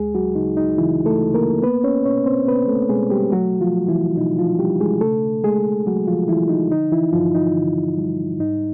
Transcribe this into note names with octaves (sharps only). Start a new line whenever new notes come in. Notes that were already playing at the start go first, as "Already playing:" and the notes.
Already playing: D2 G#3 G#4
F#3 F#4
C#3 D#4
D#4
C#3 E3 E4
A3 A4
C#3
A#3 A#4
A#3 B3 B4
C#4 C#5
B2 C#4 C#5
C4 C5
A#3 B3 B4
A3 A4
B2 G#3 G#4
G3 G4
F#3 A3 F#4
F3 F4
F#3
E3 E4
B2 D#4
F3 F4
G3 D4 G4
G#3 G#4
C#3 A3 A4
G#3 A3 G#4
F#3 A3 F#4
F3 F4
E3 F3 E4
D#4
D3 D#4
E3 E4
G2 F3 F4
D#4
D3
G3
G#2 D#4